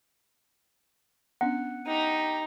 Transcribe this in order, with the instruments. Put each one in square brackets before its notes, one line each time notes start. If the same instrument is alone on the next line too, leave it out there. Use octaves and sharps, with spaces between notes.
[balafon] B3 C#4 D4 [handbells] F#5
[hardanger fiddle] D#4 [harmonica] G4 A#5